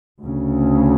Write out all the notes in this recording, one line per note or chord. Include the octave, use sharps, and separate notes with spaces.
D2 C#3